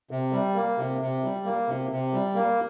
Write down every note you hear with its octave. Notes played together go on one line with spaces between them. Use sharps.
C3
G3
A#3
C3
C3
G3
A#3
C3
C3
G3
A#3